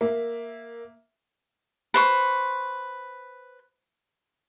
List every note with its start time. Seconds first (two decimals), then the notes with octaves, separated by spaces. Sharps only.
0.01 A#3 E5
1.94 B4 C5 C#6